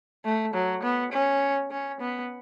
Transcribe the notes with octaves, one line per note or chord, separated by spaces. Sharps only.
A3
F#3
B3
C#4
C#4
B3